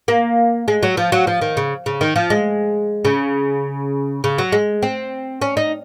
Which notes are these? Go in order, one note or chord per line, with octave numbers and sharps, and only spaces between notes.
A#3
G#3
F#3
F3
F#3
F3
D#3
C#3
C#3
D#3
F3
G#3
C#3
C#3
F#3
G#3
C4
C#4
D#4